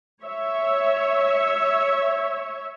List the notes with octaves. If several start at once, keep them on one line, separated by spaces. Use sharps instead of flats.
C#5 E5